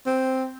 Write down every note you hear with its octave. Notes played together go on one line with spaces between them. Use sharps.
C4